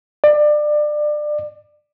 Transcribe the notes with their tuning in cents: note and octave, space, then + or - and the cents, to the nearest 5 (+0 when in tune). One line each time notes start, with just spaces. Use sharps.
D5 +25